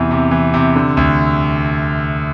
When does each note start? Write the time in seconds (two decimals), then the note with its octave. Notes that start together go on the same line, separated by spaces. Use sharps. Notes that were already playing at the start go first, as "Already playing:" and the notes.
Already playing: E2 C3 E3
0.11 C3
0.31 E3
0.54 C3
0.76 D3
0.97 D2